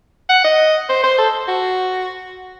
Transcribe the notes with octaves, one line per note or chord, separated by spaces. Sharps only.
F#5
D#5
C5
C5
A4
F#4